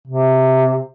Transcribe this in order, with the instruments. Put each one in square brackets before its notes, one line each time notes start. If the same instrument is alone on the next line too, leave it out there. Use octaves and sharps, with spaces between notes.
[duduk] C3